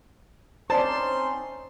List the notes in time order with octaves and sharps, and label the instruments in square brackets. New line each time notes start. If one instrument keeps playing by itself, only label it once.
[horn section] C4 C6 [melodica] C#4 D#4 [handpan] C5 D5 [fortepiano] A5